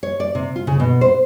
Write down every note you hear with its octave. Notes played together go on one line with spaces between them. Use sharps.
C#5
D5
C3
F4
C#3
B2
C5